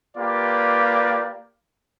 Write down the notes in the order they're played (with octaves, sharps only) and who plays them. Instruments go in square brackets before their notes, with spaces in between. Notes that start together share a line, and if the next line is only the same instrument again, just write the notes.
[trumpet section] A#3 F4 G4 B4 D5